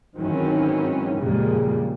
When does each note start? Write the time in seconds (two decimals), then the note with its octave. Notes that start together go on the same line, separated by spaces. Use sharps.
0.17 G#2 D#3 E3 F#3 C4 C#4
1.16 A#1 F2 C#3 G3 G#3 A#3